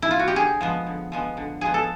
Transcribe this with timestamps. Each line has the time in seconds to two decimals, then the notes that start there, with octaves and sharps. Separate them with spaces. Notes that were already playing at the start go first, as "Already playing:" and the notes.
0.02 E4
0.11 F4
0.19 F#4
0.28 G4
0.36 D3 G#4
0.61 F3 G#3 B3
0.87 D3
1.12 F3 G#3 B3
1.37 D3
1.61 F3 G#3 B3 G#4
1.74 A4